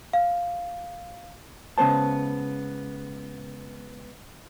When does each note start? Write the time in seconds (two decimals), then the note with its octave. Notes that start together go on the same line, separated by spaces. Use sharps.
0.13 F5
1.78 C#2 C#3 G#3 B3 C5 A5